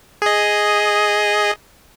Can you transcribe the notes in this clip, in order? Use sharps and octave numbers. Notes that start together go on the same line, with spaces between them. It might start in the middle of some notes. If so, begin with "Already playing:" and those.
G#4 D#5